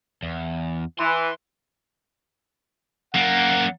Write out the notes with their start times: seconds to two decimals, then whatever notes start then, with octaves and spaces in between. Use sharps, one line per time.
0.23 E2
0.99 E3 C6
3.15 F#2 A#3 F#5